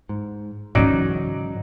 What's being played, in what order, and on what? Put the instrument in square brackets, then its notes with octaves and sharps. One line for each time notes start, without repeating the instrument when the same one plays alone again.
[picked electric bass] G#2
[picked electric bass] G#2 C4 C#4 [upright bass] C#3 E3 [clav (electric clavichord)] F#3 D#4 D5